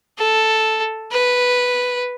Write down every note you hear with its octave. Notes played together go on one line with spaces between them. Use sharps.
A4
B4